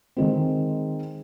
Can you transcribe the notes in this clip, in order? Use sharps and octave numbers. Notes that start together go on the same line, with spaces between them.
D#3 G#3 C4